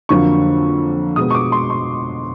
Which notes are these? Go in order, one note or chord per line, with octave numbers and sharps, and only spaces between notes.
F2 D3 F#3 A#3 C#6
B2 G#3 B3 D#6
C#6
D6
C6
C#6